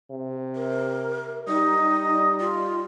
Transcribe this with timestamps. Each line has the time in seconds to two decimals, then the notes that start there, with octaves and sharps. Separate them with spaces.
0.11 C3
0.56 A#4
1.48 G3 D#4 D#5
2.40 F4